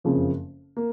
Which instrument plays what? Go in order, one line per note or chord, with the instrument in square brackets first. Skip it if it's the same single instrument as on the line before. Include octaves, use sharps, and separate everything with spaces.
[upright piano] F#1 F2 C#3 F3 A#3
A#3